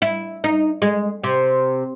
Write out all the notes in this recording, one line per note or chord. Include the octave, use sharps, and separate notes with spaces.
E4
D#4
G#3
C3